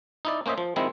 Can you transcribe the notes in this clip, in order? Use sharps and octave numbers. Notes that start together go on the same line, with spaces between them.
D#4 E4 D5
A#3 C#4 C5 D#5 E5
F3
D#3 F3 G#3 C4 E4